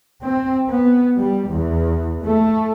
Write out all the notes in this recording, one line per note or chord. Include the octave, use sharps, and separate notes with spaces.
C4
B3
G3
E2
A3